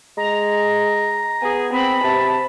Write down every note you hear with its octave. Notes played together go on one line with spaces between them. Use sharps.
G#3 A#5
B3 G#4
C4 B5
C3 A5